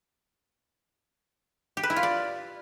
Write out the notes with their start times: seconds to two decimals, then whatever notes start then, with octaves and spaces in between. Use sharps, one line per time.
1.77 G4
1.83 B4
1.90 E4
1.96 F4
2.03 D5